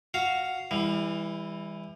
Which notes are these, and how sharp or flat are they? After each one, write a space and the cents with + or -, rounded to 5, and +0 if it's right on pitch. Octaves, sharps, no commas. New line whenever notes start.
F#4 +0 F5 +0
E3 +0 G3 +40